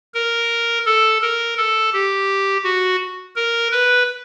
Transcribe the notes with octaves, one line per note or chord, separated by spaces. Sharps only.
A#4
A4
A#4
A4
G4
F#4
A#4
B4